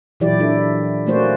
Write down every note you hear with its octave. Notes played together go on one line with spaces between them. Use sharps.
A#2 E3 F#3 E4 G4 D5
D4 E4 A4
A3 A#3 C#4 F#4 C5 D5